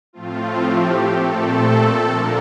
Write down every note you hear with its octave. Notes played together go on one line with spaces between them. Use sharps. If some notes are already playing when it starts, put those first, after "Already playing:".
A2 F3 A3 C4 F4
G4
A#2 A3 C4 A4
D3 F3 A#3 D4 A#4